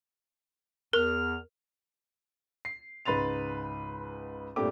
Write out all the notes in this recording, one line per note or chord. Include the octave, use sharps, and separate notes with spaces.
E2 A#4 F6
C7
C#2 G#2 B4 C6 A6 F7
G2 A#2 A3 C4 G4 D6